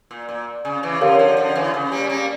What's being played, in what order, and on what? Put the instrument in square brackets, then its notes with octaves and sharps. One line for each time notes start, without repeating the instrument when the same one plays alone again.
[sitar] A#2
A#2
C#3
C#3 E3
[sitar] D3 F3 [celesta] G4 A#4 C#5 F5
[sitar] D3 F3
D3 F3
C#3 E3
C#3
G3 A#3
C#4
G3 A#3